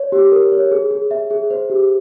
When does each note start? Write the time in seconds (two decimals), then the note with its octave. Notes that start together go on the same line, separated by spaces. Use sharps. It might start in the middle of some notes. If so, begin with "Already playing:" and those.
Already playing: C#5
0.12 G4
0.32 A#4
0.52 C#5
0.71 G#4
0.91 G#4
1.11 E5
1.31 G#4
1.50 C5
1.70 G4